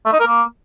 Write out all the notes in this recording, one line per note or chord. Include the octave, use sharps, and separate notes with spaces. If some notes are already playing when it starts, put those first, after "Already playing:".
A3
D#4
A#4
A#3